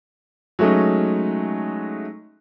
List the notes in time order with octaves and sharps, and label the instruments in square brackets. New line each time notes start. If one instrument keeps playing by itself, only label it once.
[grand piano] F#3 G#3 A3 C#4 D#4